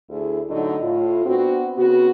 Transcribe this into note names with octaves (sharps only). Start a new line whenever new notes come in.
D2 E4 G#4
A2 D3 F#3 D#4
A2 F4
B3 C4 D4 F#4
C#3 B3 C4 F#4